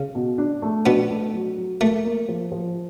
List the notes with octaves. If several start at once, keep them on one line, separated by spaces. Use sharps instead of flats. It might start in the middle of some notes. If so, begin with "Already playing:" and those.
Already playing: C#3
B2
D4
A3
B2 B3 D4
A3
F#3
F#3
A3 A#3
A#3
F3
F3